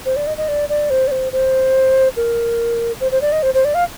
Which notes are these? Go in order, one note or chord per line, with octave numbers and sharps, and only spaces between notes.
C5
D5
D#5
D#5
D5
D5
C5
D5
C5
C5
A#4
C5
C5
D5
D#5
C5
C5
D5
F5